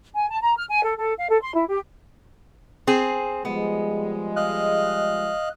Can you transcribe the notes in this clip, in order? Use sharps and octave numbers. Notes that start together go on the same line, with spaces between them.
G#5
A5
A#5
F6
G#5
A4
A4
F5
A4
C6
E4
G4
C4 G#4
F3 G3 G#3 B3
D#5 F5 F#6